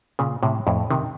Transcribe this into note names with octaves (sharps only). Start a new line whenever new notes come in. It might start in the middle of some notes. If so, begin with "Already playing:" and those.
A#2 C#3
A2 C3
F2 A2
C3 D#3